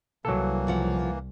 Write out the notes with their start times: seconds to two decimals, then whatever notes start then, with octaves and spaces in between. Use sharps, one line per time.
0.25 C2 E3 F#3 A#3 A4
0.67 C#3 F3 F#5